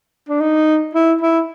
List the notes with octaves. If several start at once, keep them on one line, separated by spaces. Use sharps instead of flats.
D4
D#4
E4
E4